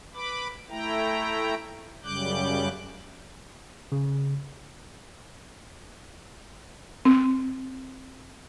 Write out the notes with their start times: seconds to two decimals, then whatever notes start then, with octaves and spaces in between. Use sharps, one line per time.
0.14 B4 B5 D6
0.70 A3 E4 G5 A#5
2.04 F#2 C#3 G3 D6 F#6 G6
3.92 C#3
7.05 C4